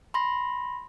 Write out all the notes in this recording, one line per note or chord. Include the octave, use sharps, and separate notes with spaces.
B5 C6 A#6